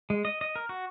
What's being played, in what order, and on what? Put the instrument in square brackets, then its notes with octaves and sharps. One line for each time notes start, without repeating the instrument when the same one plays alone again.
[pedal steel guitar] G#3
D#5
D#5
A#4
F#4